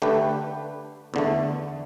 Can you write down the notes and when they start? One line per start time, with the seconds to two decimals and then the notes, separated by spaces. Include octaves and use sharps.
0.02 D3 A3 G4 B4
1.14 E2 D3 A3